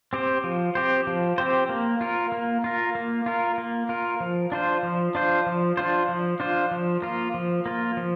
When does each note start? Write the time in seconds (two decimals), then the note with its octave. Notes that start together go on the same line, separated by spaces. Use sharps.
0.13 C4 G4 C5
0.44 F3
0.75 C4 G4 C5
1.07 F3
1.38 C4 G4 C5
1.69 A#3
2.01 F4 A#4
2.32 A#3
2.64 F4 A#4
2.95 A#3
3.26 F4 A#4
3.58 A#3
3.89 F4 A#4
4.20 F3
4.52 D4 F4 C5
4.83 F3
5.15 D4 F4 C5
5.46 F3
5.77 D4 F4 C5
6.09 F3
6.40 D4 F4 C5
6.71 F3
7.02 A#3 F4
7.34 F3
7.66 A#3 F4
7.97 F3